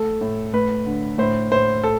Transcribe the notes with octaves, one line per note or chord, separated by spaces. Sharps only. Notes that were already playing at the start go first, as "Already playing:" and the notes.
Already playing: A3 A4
A2
A3 B4
D3
A2 C5
A2 C5
A4